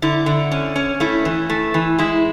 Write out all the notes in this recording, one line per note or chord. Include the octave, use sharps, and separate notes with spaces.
D3 E4
D3
C#4
C#4
A3 E4
E3
A3
E3
G#3 E4